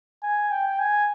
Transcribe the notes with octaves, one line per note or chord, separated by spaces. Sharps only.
G#5
G5
G#5